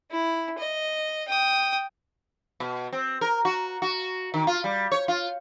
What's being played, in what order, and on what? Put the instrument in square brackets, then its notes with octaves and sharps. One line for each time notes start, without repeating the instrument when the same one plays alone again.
[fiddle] E4
D#5
G5 D#6
[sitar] B2
C4
A#4
F#4
F#4
D#3
F4
G3
C#5
F4